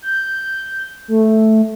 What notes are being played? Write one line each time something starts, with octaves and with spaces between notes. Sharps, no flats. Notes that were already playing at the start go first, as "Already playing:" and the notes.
G6
A3